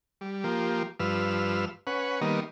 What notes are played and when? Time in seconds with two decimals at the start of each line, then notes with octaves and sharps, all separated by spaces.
0.21 G3
0.44 F3 A#3 G4
1.00 G2 F3 B4 E6 F6
1.87 C#4 B4 F#5
2.21 D#3 G3 A#3 B3 D#5